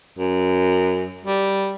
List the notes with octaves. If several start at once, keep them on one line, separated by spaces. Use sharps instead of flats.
F#2
G3